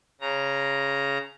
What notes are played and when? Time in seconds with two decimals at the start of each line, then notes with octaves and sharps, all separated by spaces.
0.21 C#3 A#5